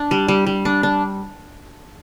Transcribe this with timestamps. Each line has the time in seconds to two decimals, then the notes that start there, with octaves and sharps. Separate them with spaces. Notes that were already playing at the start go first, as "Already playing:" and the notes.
Already playing: D4
0.11 G3
0.28 G3
0.47 G3
0.65 D4
0.83 D4